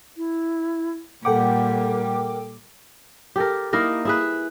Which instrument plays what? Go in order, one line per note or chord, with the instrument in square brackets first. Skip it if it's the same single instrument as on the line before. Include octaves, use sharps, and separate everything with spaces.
[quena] E4
[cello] A#2 G3 [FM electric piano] A4 G5 D6 [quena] A#4 [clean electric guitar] F#5
[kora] G4 A4 A#4
A#3 D#4 E4 A#4
E4 G#4 B4